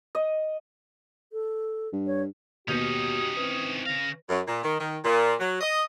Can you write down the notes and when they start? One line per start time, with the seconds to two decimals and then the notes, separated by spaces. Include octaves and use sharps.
0.15 D#5
1.33 A4
1.93 G2
2.07 C#5
2.68 D#2 B2 C#4 D#4 F#4 G4 D#6 G6
3.37 D#3 E3 C4 B4
3.86 C#3 F5 A#6
4.30 F#2
4.48 A#2
4.63 D#3
4.80 D#3
5.04 A#2
5.40 F#3
5.61 D#5